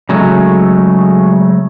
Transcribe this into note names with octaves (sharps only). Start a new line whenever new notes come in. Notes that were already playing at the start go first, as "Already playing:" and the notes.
C#3 F#3 G#3 A3